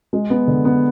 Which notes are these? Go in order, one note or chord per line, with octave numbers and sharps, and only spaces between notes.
G#3
B3
D3
B3